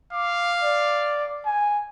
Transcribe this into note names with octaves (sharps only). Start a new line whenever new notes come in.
F5 D6
D5
G#5